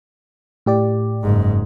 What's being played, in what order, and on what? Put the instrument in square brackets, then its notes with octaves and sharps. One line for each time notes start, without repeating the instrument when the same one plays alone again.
[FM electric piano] A2 G4 D5
[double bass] F#1 G#2